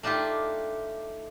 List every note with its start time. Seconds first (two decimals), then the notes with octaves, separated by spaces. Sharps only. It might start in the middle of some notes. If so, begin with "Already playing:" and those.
0.03 A3 D4 D#4 F4 G4